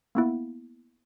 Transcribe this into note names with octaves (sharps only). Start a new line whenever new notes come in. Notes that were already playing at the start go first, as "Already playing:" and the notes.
A#3 B3 E4